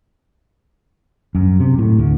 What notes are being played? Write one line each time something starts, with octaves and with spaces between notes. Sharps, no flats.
F#2
C3
A2
D2